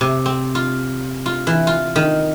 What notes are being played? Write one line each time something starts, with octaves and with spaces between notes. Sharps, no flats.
C3
C4
F4
F4
E3
F4
D#3